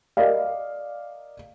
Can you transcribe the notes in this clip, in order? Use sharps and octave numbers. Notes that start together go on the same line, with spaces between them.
A#4 D5 D#5 F5